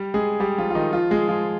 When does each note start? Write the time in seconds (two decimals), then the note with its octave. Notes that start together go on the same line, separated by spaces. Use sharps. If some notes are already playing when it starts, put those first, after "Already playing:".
Already playing: G3 G4
0.14 G#3 G#4
0.40 G3 G4
0.58 F3 F4
0.70 F4
0.75 D#3 D#4
0.93 F3 F4
1.11 G#3 G#4
1.28 F3 F4